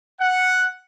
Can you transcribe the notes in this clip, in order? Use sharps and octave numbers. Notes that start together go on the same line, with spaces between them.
F#5